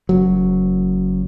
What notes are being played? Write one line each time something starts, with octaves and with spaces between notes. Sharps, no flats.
F#1 F#3